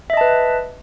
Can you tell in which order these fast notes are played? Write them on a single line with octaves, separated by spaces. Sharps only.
E5 D#5 A5 B4